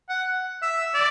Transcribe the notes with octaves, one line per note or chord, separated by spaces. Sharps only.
F#5
E5
D5